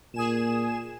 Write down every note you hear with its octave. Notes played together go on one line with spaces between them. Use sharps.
A#2 G#4 G#5 E7